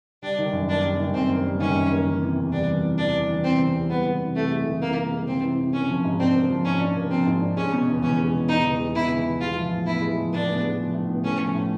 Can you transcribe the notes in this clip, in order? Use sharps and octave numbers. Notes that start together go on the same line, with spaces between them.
G3 D4
D#3
F#2
A#3 D4
G3
D#3
F#2 C4
A#3
G3
D#3 C#4
F#2
A#3
E3
C3
E2
G3 D4
E3
C3
E2 D4
G3
E3
C3 C4
E2
G3
G#3 B3
E3
C3
C3 A3
G#3
E3
C3 A#3
C3
G#3
E3 C4
C3
C3
A#3 C#4
F3
G#2
C4 D4
A#3
F3
G#2 C#4
D4
A#3
F3 C4
G#2
D4
G#3 C#4
B2
E2
E2 C#4
G#3
B2
E2 D#4
E2
G#3
B2 E4
E2
E2
G#3 F4
F3
A2
B3 E4
G#3
F3
A2 D4
B3
G#3
F3
A2
B3
A3 C#4
F3
A2